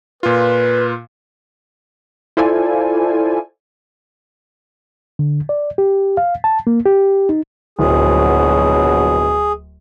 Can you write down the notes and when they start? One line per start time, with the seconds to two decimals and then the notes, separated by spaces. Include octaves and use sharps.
0.23 A#2 F4 B4
2.37 E4 F4 A4 C5 D5 G#5
5.19 D3
5.49 D5
5.78 G4
6.17 F5
6.44 A5
6.67 A#3
6.85 G4
7.29 D#4
7.79 D1 A#1 B2 F#3 G#4